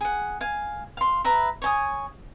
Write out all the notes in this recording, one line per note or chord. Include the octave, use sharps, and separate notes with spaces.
G#4 F#5
F5 G#5
F5 C6
B4 E5 A#5
C#5 G#5 D#6